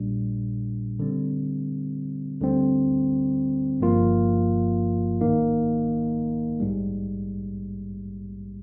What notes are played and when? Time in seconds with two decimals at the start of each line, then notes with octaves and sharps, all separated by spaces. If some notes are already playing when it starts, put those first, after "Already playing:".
Already playing: A#1 A#2 G3 D4
0.99 D3 G3 C4
2.41 D2 D3 G3 C4
3.80 G1 G2 F3 A#3 F4
5.21 A#1 G#2 D#3 A#3 D#4
6.60 A#1 G#2 G3